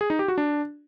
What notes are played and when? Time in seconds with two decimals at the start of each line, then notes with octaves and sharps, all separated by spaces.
0.01 G#4
0.10 D#4
0.19 G4
0.28 F#4
0.38 D4